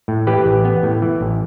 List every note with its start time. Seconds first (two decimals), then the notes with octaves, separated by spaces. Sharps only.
0.08 A2
0.27 E3 G4 B4
0.46 A1
0.65 B3
0.83 A2
1.02 E3
1.21 A1